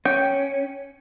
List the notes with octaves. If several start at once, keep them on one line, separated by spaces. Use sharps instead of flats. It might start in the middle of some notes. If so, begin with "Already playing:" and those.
C#4 G5